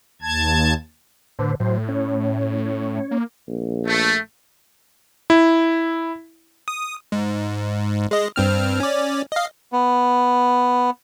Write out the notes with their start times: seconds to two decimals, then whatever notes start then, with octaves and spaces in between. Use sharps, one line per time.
0.22 D#2 A5 G#6
1.39 A2 D3 B4 C5
1.60 A2 F#3 C5
1.89 C#4 C#5
3.11 A#3
3.48 A#1
3.87 A3
5.30 E4
6.68 D#6
7.12 G#2
8.11 G#3 D#5
8.36 G2 C4 F6
8.80 C#4 D5
9.32 D#5 F5
9.72 B3